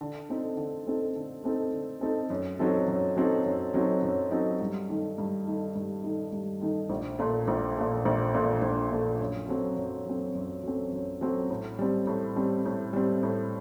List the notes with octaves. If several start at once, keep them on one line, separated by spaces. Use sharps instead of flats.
D3
A3 C4 D#4 A4
D3
A3 C4 D#4 A4
D3
A3 C4 D#4 A4
D3
A3 C4 D#4 A4
F#2
F#3 C4 D#4 A4
F#2
F#3 C4 D#4 A4
F#2
F#3 C4 D#4 A4
F#2
F#3 C4 D#4 A4
G2
D#3 A3 D#4
G2
D#3 A3 D#4
G2
D#3 A3 D#4
G2
D#3 A3 D#4
A#1
A#2 A3
A#1
A#2 A3
A#1
A#2 A3
A#1
A#2 A3
F#2
F#3 A3 C4
F#2
F#3 A3 C4
F#2
F#3 A3 C4
F#2
F#3 A3 C4
A2
G3 C4
A2
G3 C4
A2
G3 C4
A2